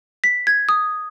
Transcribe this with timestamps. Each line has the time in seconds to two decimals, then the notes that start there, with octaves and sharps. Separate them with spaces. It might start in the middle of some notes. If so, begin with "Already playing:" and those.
0.24 B6
0.47 G#6
0.69 D#6